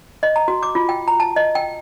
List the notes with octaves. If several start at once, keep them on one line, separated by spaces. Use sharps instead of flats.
D#5
A#5
F#4
D6
F4
G5
A#5
A5
D#5
G5